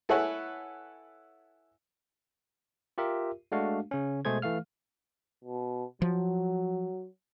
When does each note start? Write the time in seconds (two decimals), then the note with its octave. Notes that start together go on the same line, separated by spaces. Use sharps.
0.09 E4 A4 B4 C#5 F#5 G#5
2.98 F4 G4 A#4 E5
3.52 G#3 A3 D4 F#4 F5
3.91 C#3 C#4
4.25 B2 G#3 A3 G#4 C5 G#6
4.42 E3 A3 F5 F6
5.44 B2
6.02 F3 F#3